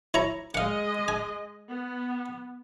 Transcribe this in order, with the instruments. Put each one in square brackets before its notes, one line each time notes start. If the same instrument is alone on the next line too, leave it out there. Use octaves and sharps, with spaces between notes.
[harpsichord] E4 C#5 A#5
[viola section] G#3 G#4 D#5 [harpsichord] F5 F#5
[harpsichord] G#5
[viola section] B3